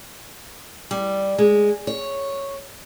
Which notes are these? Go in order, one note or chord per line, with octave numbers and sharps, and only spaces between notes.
G3
G#3
C#5